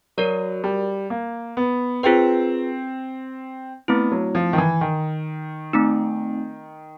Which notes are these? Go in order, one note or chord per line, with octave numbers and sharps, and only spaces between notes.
F#3 F#4 A#4 D5
G3
A#3
B3
C4 F4 G#4 B4
A3 B3 C4 E4
F#3
F3
D#3
E3
D#3
A3 C4 D#4